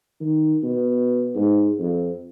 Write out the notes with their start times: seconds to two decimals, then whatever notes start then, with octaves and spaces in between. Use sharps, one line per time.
0.20 D#3
0.63 B2
1.35 G#2
1.79 F2